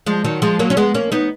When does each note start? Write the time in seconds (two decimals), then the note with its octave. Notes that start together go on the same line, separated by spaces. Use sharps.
0.06 F3 G#3
0.24 D#3 F#3
0.42 F3 G#3
0.59 F#3 A#3
0.70 C#4
0.77 G#3 B3
0.94 A#3 C#4
1.12 B3 D#4